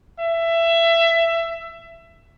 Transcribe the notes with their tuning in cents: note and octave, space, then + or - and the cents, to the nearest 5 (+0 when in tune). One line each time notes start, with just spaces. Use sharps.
E5 +20